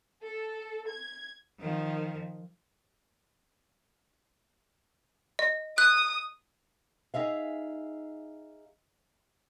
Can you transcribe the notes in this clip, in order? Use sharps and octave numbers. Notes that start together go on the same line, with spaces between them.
A4
G#6
D#3 F3
D#5
D#6 F#6
D#4 G#4 E5 F5